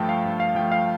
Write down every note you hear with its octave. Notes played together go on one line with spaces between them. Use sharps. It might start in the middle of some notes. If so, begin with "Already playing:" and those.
Already playing: G2 F3 A3 G5 A5
F5
G2
F5
F3 A3 G5
F5